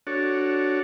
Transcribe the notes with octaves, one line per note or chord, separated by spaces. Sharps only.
D4 F#4 A4 C#5